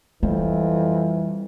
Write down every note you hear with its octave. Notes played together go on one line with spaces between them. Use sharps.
F2 E3 G3